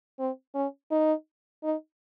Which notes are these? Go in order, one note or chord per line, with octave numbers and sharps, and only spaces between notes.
C4
C#4
D#4
D#4